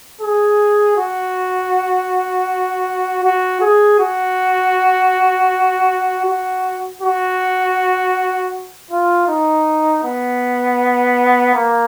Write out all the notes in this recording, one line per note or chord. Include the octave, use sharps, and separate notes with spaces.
G#4
F#4
F#4
G#4
F#4
F#4
F#4
F4
D#4
B3
A#3